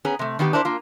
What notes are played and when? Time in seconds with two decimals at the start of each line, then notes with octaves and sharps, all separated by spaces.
0.05 B3 C#4 G#4 A#5
0.19 C3 A3
0.39 D#3 B3 D#4 G4
0.53 D4 E4 A#4 C5
0.65 A#3 F4